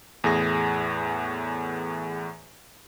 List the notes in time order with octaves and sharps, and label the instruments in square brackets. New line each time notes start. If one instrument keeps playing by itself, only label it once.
[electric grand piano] E2 A2 G#4 A#6